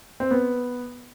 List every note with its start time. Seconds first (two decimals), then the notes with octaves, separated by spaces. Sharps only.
0.20 C4
0.31 B3